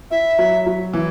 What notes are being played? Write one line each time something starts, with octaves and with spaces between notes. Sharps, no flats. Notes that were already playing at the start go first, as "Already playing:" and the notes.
E4 E5
F#3
F#3
E3